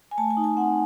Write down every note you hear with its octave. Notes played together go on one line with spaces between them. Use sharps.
G#5
A3 A5
G#5
D#4
G#5
C4 F#5